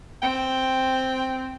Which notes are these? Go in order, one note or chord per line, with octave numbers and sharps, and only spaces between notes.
C4 G5